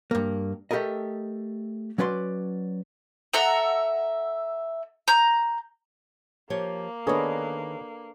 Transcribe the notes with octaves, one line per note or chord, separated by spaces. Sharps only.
G2 A#3
A3 G4 A4 A#4 D#5
F#3 C#4 B4 D5 C6
A4 E5 F#5 A#5
A#5 G6
F3 A#3 G4 C#5
D#3 B3 D4 G#4 A4 B4 C#5 D#5